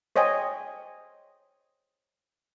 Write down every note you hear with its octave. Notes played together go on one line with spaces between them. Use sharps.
C5 C#5 D#5 G5 G#5